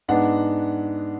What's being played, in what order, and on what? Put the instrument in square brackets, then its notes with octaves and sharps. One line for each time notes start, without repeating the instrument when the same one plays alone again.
[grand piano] G#2 G#3 B3 D4 F#5